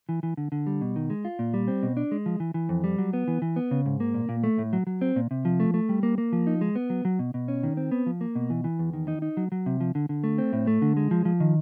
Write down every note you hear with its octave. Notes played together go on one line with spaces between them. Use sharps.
E3
E3
D3
D3
G3
B2
D#3
G#3
F4
A#2
G3
C4
B2
D4
G#3
F3
E3
E3
F2
G3
F#3
B3
E3
E3
B3
C#3
G#2
A#3
A#2
A#2
A3
A2
F#3
F#3
C4
A#2
C3
F3
A3
A3
G3
A#3
A#3
F3
D#4
G#3
B3
F#3
F#3
B2
B2
C#4
D#3
C4
B3
F3
A#3
B2
E3
E3
E2
D#3
D#4
D#4
F#3
F#3
C3
F3
D3
D3
A3
C4
A2
A3
D3
G#3
F3
F3
D#3